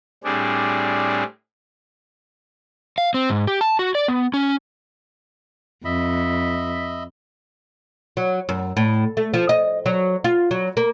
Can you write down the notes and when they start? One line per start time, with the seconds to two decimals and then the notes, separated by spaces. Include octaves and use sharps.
0.24 A2 G3 C4 D4 G#4
2.98 F5
3.14 C4
3.30 G#2
3.47 G4
3.61 A5
3.79 F#4
3.95 D5
4.08 B3
4.34 C#4
5.85 F2 D#5 E5 B5
8.17 F#3
8.49 F#2
8.77 A2
9.17 A3
9.34 F3
9.49 D#5
9.86 F#3
10.24 F4
10.51 F#3
10.77 A#3